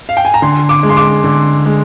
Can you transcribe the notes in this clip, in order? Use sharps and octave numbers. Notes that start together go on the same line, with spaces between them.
F5
G5
G#5
A#5
D3 C6
D6
G#3
C6
D6
D3
G#3